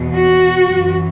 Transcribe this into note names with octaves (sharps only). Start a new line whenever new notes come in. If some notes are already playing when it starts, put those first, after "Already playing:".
Already playing: E2 B2
F#4
F#2 E3